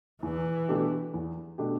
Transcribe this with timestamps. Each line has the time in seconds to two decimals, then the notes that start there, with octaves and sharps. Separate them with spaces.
0.23 E2 E3
0.68 B2 A3 D4 G4
1.14 E2
1.58 B2 A3 D4 G4